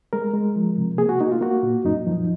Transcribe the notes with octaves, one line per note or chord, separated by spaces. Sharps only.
G#3 A#4
G#3
F3
C3
A#3 G#4
F#4
A#3 D#4
F4
A#3 F#4
A#2
F#2 D#4
F3